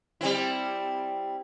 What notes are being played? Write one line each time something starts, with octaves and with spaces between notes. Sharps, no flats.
G3 C4 E4